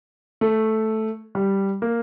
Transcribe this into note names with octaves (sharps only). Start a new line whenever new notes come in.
A3
G3
A#3